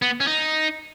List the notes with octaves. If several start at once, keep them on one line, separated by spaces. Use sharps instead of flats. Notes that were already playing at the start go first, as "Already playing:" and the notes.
B3
C#4
D#4